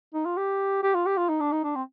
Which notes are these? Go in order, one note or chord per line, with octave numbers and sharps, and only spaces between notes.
D#4
F4
G4
G4
F4
G4
F4
D#4
D4
D#4
D4
C4